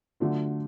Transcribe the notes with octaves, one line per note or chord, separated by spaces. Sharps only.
D3 F#3 A3 D4 F4